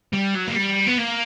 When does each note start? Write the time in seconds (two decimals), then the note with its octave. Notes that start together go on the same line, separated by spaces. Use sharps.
0.13 G3
0.35 F#3
0.47 A#3
0.56 G3
0.87 B3
0.98 A#3